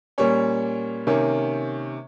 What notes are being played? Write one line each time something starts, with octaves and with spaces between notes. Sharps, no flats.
A#2 G3 A#3 C#4 C#5
C3 D#3 A#3 C#4